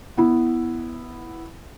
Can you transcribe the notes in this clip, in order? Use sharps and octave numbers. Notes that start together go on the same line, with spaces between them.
B3 E4